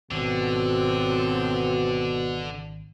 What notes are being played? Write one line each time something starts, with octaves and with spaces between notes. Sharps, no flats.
G#1 B2 D3 F3 F#3 C4